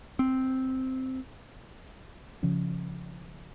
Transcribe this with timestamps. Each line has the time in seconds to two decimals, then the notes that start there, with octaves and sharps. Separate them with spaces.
0.19 C4
2.43 C#3 F3 C#4